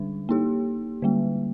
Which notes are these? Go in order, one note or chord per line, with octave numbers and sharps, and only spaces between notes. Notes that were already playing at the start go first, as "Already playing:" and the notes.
Already playing: D3 G3 D4
A#3 D#4 G4
D3 G3 A#3